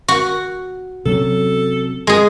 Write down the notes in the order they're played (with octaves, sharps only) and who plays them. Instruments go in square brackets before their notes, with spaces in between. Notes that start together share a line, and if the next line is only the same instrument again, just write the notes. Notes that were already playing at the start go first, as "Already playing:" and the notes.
[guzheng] F#4
[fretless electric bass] C3 F#3 C#4 [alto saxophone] A4
[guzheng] G#3 G#4